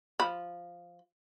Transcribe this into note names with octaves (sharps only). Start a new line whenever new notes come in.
F3 B5